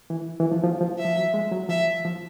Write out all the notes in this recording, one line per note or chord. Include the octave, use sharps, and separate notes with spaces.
E3
E3
F3
F3
F3
E5
F3
F#3
G#3
F#3
F3 E5
F3